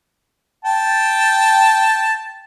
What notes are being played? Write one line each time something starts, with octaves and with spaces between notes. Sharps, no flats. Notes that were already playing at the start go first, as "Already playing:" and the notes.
G5 A5